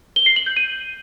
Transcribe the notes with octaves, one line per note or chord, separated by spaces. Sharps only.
G7
C7
F#7
G6
D#7